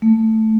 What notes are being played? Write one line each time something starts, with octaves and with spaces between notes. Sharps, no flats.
A3